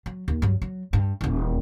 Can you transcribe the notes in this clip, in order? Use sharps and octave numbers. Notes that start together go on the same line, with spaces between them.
F#3
D#2
G2 F#3
F#3
G2
D#1 E2